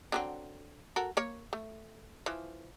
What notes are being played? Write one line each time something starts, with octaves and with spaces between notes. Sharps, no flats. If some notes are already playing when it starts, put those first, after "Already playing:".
D3 F#3 C4
F#4 A4 A#4
A#3 C#5
A3
E3 F3